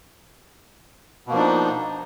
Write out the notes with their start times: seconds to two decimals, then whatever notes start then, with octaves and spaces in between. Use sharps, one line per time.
1.27 B2
1.30 A#3
1.33 F3
1.36 D4
1.39 D#4